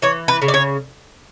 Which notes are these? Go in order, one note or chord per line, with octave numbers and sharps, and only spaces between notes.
E3 C#5
B4
C#3
D5
C#5